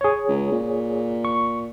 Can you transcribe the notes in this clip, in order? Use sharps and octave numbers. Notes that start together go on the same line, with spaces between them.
G#4 C#5
C#2
A#2
C#6